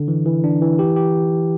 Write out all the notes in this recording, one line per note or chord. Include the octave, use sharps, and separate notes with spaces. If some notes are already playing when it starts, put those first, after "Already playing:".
Already playing: D3
E3
E3
D4
E3
G4
G4